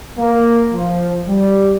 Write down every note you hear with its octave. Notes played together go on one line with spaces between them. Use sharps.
A#3
F3
G3